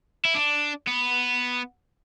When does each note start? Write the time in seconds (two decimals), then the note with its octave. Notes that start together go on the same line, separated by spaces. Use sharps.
0.25 E4
0.35 D4
0.87 B3